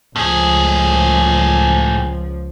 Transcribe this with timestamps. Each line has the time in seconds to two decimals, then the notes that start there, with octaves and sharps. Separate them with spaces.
0.16 C#2 A2 F3 G#4